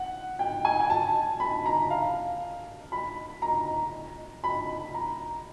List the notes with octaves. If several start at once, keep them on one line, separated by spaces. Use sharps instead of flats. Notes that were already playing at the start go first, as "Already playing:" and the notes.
Already playing: F#5
G5
G#5
G#5
A5
B5
A#5
F5
B5
A#5
B5
A#5